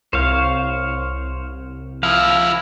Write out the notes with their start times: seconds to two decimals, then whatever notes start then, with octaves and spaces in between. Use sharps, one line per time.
0.13 C2 C5 C#5 F5
2.03 F3 E4 F5